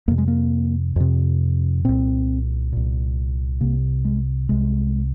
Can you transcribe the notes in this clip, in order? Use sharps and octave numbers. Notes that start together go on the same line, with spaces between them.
F2 C3 A#3
G#3
A#3
F2 C3
C2 A#2 C4
C2 A#2
C2 C3 A#3
G#3
C2 C3 G#3